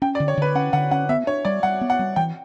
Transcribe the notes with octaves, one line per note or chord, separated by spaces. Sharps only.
C#4 G5
D5
D3
C#5
D3 B4
C#4 F#5
D3 F#5
C#4 F#5
B3 E5
D4 C#5
G3 D5
G3 F#5
B3
F#5
G3
E3 G5